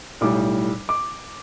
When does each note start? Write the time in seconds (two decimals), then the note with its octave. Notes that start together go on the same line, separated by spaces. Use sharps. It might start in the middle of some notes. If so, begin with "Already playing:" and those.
0.21 B1 A2 G3 D6
0.89 D6